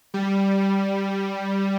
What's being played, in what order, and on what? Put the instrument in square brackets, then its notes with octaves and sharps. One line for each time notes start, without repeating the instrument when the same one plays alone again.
[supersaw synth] G3